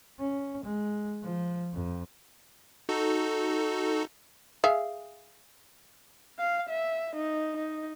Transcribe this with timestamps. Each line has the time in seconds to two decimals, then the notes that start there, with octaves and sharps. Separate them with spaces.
0.19 C#4
0.63 G#3
1.23 F3
1.73 F2
2.89 D#4 F#4 A4
4.64 G#4 E5 F5
6.39 F5
6.70 E5
7.16 D#4
7.57 D#4